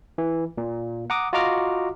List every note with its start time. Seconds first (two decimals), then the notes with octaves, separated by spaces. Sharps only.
0.18 E3
0.58 A#2
1.10 F#5 A#5 D6 D#6
1.33 F4 F#4 D#5 A#5 D6 F6